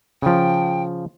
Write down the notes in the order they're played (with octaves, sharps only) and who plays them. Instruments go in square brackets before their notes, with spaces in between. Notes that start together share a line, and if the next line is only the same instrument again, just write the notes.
[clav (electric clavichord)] C#3 F3 [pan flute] G5